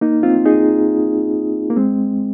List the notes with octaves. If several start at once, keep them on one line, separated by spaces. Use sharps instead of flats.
A#3 D#4
C4 F4
D#4 G#4
A#3
G#3 C4